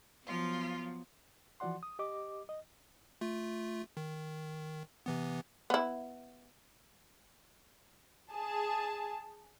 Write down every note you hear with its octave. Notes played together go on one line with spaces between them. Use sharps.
F3 F#3 B3 F4
E3 F3 F#4 D5 F#5 C6
D#6
G4 D#5 D6
D#5
A3 F4
D#3
C3 E3 B3
B3 E4
G#4 A5